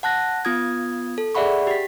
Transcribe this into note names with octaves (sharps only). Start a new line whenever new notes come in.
F#5 A5 F#6 A#6
B3 F4 D#6 G#6
A4
G#4 D5 E5 F#5 B5 C#6
G4 B6